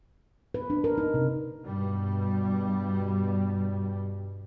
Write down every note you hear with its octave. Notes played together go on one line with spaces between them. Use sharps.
B4
D4
A#4
D#4
C3
G2 B2 G3